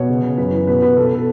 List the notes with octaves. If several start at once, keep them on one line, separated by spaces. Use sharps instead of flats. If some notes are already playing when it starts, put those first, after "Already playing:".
Already playing: B2 C#5
C#3
C#3
F#2 B4
E3
B2 B4
B2 B4
B2 A4
B4
B2 A4